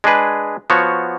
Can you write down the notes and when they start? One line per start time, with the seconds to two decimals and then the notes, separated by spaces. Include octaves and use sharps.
0.04 G#3 D4 G#4 B4
0.70 F3 B3 F#4 C#5